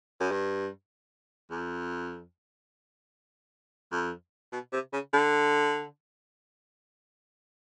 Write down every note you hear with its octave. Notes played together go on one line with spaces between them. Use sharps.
F#2
G2
F2
F2
B2
C3
C#3
D3